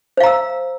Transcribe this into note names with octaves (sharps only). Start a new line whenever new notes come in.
C5 F5 A#5 E6